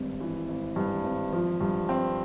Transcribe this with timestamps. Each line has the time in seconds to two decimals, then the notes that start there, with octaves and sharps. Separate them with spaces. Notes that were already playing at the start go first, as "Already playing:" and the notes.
Already playing: G#1 G2
0.20 E3
0.48 G#1
0.76 G2
1.04 G#1
1.32 F3
1.61 G2
1.89 C4